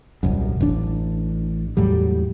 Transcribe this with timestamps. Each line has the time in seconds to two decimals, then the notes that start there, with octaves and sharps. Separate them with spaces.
0.23 D#1 C2 F#2
0.60 A1 D4
1.77 E2 A2 F#3 G3